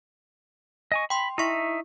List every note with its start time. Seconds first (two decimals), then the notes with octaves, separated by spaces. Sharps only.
0.92 D#5 G#5 C#6
1.10 G5 B5 C6
1.38 D#4 E4 E5 C#6